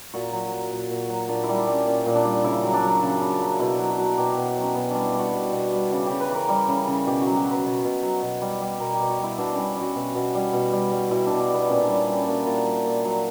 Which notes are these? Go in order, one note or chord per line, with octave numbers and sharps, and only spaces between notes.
A#2 F#4
F#3
F#3
A#2
A#2
F#3
A#2 D4
E4
G3
D4
G3
C#4
A#2 C#4
A#2
D4
G3
C#3 E4
F#3
D4
F#3
C#3
C#3
F#3
B2 E4
F#3
F#4
F#3
B2 G4
B2 G4
G4
F#3 C#4
B2 B3
G3 D4
E4
G3 F#4
B2
B2
G3
C#3 G4
C#3 G4
B4
E3 A#4
G3
C#3
C#3
B2 G4
F#3 F#4
G4
F#3
B4
B2
B2
F#3
B2
G3
G3
B2 A#4
G4
B2
F#4
G3 E4
B2 D4
C#4
G3
G3 F#4
B2
B2
G3
B2
G3
G3
B2 E4
B2 D4
D4
G3 B3
A#2 C#4
G3 D4
C#4
G3 D4
A#2 F#4
A#2
G3
A#2
F#3